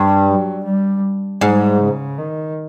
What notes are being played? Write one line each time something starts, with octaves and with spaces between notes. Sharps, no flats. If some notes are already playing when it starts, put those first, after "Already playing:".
Already playing: G2
F#3
G3
G#2 G3
C#3
D#3